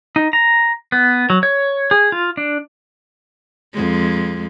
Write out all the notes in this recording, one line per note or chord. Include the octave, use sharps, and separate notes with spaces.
D#4
A#5
B3
F#3
C#5
G#4
F4
D4
F2 G#3